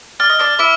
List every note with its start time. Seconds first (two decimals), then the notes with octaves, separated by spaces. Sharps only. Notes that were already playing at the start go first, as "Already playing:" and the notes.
0.20 D5 F6
0.29 D#5
0.39 D4 D5
0.59 E4 E5 D6